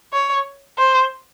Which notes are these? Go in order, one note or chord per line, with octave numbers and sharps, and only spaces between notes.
C#5
C5